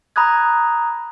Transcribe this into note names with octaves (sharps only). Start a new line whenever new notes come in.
A#5 B5 D#6 F#6 G#6